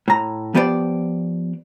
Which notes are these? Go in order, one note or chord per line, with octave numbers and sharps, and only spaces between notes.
A2 A#5
F3 B3 G4 C5 D5